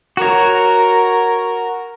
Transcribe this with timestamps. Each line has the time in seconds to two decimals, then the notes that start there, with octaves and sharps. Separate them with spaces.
0.17 F#4 A#4 C#5